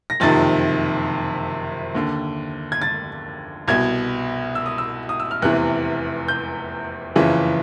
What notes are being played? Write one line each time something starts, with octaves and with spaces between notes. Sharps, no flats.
A#6
F#1 F2 C3 D#3 A6
D#2 D3
G#6
A6
C2 B2 G#6
E6
D#6
E6
D#6
E6
F6
F1 E2 C3 E3 F#6
G6
F#1 F2 C#3 E3